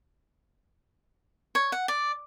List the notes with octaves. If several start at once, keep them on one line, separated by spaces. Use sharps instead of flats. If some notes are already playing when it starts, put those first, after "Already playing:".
C#5
F#5
D5